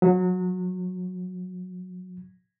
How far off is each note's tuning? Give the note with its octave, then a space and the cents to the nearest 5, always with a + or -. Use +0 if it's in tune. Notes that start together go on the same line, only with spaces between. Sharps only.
F#3 -25